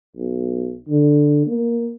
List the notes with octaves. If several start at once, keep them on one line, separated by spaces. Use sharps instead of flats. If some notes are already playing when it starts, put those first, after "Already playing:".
B1
D3
A#3